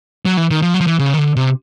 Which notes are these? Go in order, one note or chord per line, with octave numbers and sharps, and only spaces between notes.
F#3
E3
D#3
F3
F#3
F3
E3
C#3
D#3
D3
C3